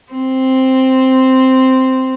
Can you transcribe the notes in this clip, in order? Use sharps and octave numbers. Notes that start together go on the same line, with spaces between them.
C4